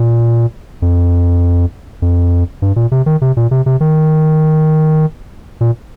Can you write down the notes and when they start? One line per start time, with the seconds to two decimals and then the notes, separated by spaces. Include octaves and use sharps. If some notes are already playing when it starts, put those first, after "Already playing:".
Already playing: A#2
0.82 F2
2.02 F2
2.62 G2
2.76 A#2
2.92 C3
3.06 D#3
3.22 C3
3.37 A#2
3.51 C3
3.66 C3
3.80 D#3
5.61 A#2